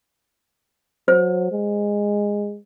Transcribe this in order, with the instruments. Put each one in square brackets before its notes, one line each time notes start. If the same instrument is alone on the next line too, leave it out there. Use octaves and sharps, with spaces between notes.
[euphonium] F#3 [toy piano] C5
[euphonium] G#3